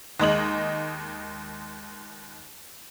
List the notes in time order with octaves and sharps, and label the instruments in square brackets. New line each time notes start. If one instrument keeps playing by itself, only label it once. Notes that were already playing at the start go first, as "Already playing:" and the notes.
[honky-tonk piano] D#2 G#3 D#5 F#7